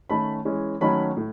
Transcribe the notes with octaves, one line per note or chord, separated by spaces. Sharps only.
D#3 A3 C#4 B5
E3 G#3 C#4
D#3 F#3 A3 C#4 B5
A2